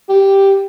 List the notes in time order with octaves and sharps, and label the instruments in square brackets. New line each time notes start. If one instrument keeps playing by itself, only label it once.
[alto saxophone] G4